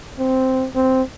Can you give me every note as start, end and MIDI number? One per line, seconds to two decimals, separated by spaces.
0.19 0.67 60
0.76 1.03 60